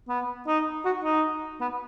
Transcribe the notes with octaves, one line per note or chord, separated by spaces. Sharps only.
B3
D#4
F#4
D#4
B3